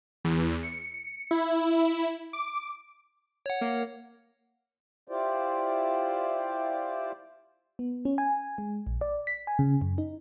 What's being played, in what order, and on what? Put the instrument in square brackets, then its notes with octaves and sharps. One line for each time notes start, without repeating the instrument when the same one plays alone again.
[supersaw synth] E2
C#7
E4
D6
[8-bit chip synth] C#5 F#5
[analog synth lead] A#3
[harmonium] E4 F4 G4 C5 D5
[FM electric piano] B3
C#4
G#5
G#3
A#1
D5
B6
G#5
C#3
F#2
D#4